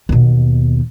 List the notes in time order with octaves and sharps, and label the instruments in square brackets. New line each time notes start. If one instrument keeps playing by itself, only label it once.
[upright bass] D#2 B2